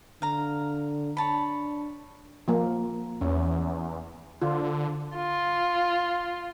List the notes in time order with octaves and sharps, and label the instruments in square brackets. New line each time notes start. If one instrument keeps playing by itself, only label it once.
[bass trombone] D3 [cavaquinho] F5 A#5
[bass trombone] D4 [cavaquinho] C#5 A5 B5
[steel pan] F3 A#3
[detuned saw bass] E2 [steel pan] C#4
[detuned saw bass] D3 [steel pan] F4
[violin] F4